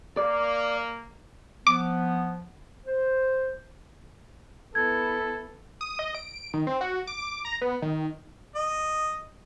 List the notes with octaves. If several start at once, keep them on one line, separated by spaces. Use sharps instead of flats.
A#3 D5
F3 B3 D6
C5
B3 E4 A4 G#6
D#6
D#5
D7
D#3
C4
F#4
D6
D6
A#5
B3
D#3
D#5